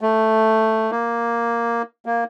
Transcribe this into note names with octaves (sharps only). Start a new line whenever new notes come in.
A3
A#3
A#3